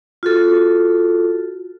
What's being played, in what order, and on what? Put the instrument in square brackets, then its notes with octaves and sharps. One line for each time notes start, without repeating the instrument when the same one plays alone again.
[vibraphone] F4 F#4 A4